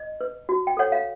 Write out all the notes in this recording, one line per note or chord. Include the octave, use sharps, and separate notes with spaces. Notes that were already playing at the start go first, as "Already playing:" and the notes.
Already playing: D#5
B4
F#4
G5
A4 C#5 F#5
F5